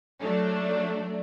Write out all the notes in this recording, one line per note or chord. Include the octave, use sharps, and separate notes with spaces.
F#3 A3 D4